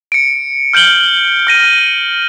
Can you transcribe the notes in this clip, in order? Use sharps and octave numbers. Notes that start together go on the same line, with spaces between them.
C#7 D7
F6 G6 D7 F#7 G7
F6 A#6 D#7